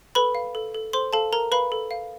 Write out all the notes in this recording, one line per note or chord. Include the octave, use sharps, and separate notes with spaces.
A4 B4 B5
F5
A4
A4
A4 C5 C6
A4 F5 A5
A4 A#4 A#5
B4 F5 B5
A4
F5